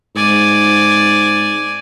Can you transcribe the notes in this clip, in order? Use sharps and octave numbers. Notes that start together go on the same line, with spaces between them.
G#2 D5 G#5